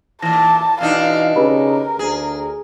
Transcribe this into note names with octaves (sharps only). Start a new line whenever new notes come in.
A#2 E3 A5 A#6
B2 E3 D4 D#4 F5
C#3 G4 A#4 B4 B5
D2 G#4